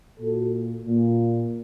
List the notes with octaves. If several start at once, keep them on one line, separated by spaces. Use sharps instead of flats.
A#2 F#4 A4
A#2